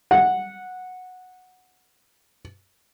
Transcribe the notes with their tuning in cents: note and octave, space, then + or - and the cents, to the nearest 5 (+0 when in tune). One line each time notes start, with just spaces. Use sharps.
F#5 -10